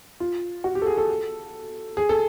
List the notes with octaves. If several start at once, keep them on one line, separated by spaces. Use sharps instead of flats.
F4
F#4
G4
A4
G#4
A4
G#4
A4